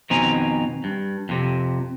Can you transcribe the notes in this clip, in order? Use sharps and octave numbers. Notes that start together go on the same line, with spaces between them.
F2 B2 D#3 C4 G#5 A#5
G2
F2 C3